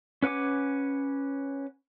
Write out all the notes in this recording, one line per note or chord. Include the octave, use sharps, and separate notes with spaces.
C#4 B4 F#5 G#5 D6